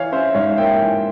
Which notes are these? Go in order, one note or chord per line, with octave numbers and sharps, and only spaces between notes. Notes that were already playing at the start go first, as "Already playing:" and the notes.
Already playing: E3 C#5 F5
C#4 C5 E5
G#2 C#5 F5
A#3 E5 G5
E3